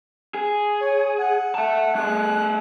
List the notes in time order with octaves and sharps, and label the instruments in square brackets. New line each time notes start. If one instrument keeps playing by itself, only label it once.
[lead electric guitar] G#4
[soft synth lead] C#5
F#5
[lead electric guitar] E5 A5
[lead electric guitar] A3 G#4 [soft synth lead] F#6